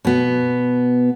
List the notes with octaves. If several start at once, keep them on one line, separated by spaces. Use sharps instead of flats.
B2 B3